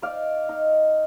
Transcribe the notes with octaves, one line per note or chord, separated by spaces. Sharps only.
D#4 D5 F5
D#4